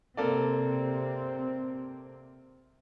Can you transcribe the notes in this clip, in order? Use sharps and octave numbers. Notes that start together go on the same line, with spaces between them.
C3 A#3 C4 A4 D5